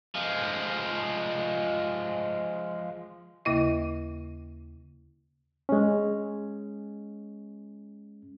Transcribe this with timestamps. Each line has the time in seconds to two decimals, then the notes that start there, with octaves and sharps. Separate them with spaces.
0.15 F3 G#3
3.45 D#2 C#3 A#3 E4 D#5
5.69 G#3 C#4